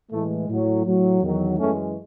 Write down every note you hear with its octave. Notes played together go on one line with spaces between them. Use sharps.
A2 E3 G#3 A3
A2 F#3
A2 F#3
E2 D#3 F#3
F#2 E3 G#3 A3 C#4